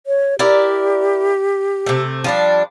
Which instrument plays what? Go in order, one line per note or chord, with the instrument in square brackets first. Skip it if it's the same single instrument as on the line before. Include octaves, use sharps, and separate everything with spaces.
[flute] C#5
[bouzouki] E4 A#4 D5 [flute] G4
[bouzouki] C3 A3
F3 G3 D4